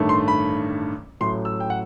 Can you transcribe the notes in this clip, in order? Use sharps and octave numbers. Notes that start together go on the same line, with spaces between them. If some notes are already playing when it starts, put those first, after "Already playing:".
Already playing: A1 G2 D#3 A3
C6
B5
A1 A2 F#3 A3 C6
E6
G5
F#5